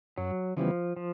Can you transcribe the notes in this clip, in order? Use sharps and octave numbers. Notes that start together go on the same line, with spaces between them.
F#2 F#3
C#3 E3 F3 G3 B3
F3